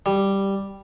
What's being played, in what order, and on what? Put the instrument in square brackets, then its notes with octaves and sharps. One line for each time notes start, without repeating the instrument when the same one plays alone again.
[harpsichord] G3